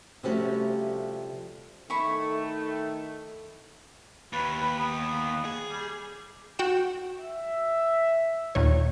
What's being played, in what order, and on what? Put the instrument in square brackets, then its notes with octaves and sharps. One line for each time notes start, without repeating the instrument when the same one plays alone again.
[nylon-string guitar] C3 F3 G3 A3 C#4 F#4
[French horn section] D#3 A3 [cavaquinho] E4 B5 C#6
[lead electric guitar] D#2 [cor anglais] B4
[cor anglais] B4
B3
[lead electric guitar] G#4
[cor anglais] G3
[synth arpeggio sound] F#4 G5 E7
[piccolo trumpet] E5
[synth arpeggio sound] D#2 A#2 C#5